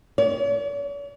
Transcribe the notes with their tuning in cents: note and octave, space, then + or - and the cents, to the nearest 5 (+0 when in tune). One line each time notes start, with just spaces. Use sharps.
C#5 +45